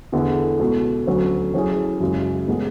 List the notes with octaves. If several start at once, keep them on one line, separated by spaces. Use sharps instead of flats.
E2 D3 A3 E4 G#4
C#2 B2 A3
D2 D3 F#3 C#4
F#3 C#4 E4 G#4
F#2 C#3 G#3
A2 E3 G#3 B3